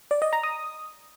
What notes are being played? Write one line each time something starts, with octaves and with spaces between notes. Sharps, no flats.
D5
D#5
A#5
D#6